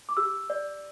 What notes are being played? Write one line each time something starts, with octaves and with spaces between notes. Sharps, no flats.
D6
G4 E6
D5